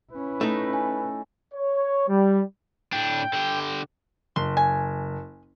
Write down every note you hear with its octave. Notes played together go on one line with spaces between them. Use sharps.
C#4 E4 B4
A3 D#4
G#5
C#5
G3
A2 D4 G5
D3 G4
F#1 C6
G#5